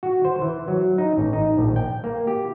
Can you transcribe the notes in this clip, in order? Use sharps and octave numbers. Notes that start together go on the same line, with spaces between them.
F#4
C5
E3
F#3
D#4
A1
D#4
A#1
G5
A#3
G4